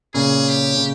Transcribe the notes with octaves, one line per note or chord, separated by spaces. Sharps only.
A#2 C#3 G#4
G4
C#3